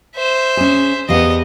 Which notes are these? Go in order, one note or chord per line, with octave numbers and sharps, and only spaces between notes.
C5 E5
C#4 G#4
E2 B3 G4 D#5 F5